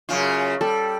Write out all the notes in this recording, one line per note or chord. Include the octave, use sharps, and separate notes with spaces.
F#2 C#3 F4
G3 A4